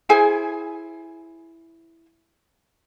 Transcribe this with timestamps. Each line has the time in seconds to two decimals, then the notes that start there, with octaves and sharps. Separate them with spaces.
0.09 E4 G#4 C5 G#5